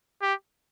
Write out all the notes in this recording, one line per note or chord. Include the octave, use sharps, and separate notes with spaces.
G4